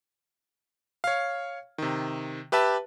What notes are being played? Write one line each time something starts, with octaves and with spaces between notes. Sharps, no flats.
C#5 F5
C3 D#3
G4 B4 E5 A5